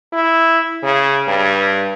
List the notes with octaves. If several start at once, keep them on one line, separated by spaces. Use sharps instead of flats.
E4
C#3
G2